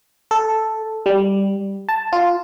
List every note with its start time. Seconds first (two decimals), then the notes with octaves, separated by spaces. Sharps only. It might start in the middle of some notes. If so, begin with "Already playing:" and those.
0.31 A4
1.06 G3
1.89 A5
2.13 F4